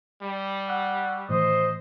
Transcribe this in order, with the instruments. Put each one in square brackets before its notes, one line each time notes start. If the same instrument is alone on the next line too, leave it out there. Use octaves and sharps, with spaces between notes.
[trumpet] G3
[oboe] F#5 [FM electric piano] C#6 E6 F#6
[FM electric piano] A2 D#3 E3 [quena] C5 [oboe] D#5